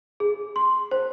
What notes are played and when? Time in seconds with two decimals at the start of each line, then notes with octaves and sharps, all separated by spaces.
0.20 G#4
0.56 C6
0.91 C5